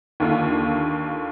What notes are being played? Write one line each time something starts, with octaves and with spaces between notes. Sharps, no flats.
D#2 D3 F4